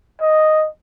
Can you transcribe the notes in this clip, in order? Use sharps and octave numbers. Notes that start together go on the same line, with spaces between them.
D#5